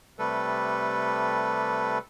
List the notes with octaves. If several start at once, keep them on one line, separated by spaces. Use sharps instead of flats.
C3 G3 A3 A4 B4